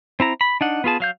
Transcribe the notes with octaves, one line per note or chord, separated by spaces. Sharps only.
C4 E4 A#5
B5
D4 D#4 F#5
B3 F4 G#4 A5
F#3 F5 G6